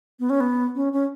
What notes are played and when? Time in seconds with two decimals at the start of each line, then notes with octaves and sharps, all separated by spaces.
0.20 B3
0.30 C#4
0.40 B3
0.75 C#4
0.93 C#4